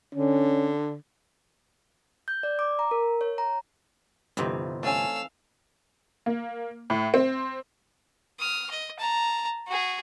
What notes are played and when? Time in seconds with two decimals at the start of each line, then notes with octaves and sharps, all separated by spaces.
0.15 D3 C#4
2.28 G6
2.43 D5
2.59 D6
2.79 A#5
2.91 A#4
3.21 C#5
3.38 A#5
4.37 G1 C3 E3 C4 D#4
4.83 A3 C#4 F5 G#5 E6
6.26 A#3
6.90 A2
7.14 C4
8.40 D#6 F6
8.70 D#5
8.99 A5 A#5
9.68 F#4 G#4